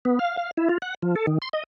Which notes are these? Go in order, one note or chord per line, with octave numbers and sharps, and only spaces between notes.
B3
F5
F5
E4
F4
F#5
F3
A4
D#3
C6
D#5